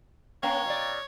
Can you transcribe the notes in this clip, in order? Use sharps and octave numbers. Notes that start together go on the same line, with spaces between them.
A#3 C#4 C#5 F5 G5 A#5
B2 D5